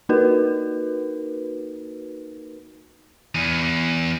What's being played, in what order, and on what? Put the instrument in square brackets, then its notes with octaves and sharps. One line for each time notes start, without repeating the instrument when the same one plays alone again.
[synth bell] A#3 D#4 F#4 A#4 B4
[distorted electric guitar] E2